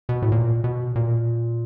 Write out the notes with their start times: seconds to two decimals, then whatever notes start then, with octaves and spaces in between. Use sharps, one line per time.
0.09 B2
0.22 A2
0.32 A#2
0.64 B2
0.96 A#2